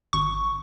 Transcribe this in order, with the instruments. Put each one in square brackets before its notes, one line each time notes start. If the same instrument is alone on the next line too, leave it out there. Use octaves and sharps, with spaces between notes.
[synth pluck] G#1 C#6